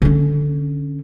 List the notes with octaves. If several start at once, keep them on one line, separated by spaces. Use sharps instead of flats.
D3 C#4